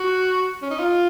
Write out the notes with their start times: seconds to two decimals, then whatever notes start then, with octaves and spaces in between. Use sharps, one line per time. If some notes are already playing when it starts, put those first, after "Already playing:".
Already playing: F#4
0.62 C#4
0.71 D#4
0.79 F4